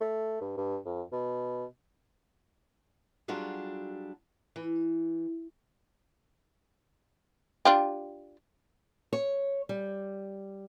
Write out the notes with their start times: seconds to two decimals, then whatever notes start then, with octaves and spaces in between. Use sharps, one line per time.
0.01 A3
0.41 G2
0.57 G2
0.86 F2
1.12 B2
3.28 F#3 G3 D4 F4 F#4 G#4
4.56 E3
7.65 D4 F4 G4
9.13 C#5
9.69 G3